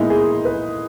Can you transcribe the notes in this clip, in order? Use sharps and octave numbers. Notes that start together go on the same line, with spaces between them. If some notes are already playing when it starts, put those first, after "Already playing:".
Already playing: A#2 G#3 B3 D#4 E4
G#4
B4